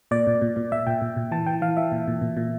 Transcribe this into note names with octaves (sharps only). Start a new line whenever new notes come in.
A#2 D5
A#2
A#2
A#2
A#2 E5
A#2 G5
A#2
A#2
E3 A5
E3 G5
E3 F5
E3 E5
A#2
A#2
A#2
A#2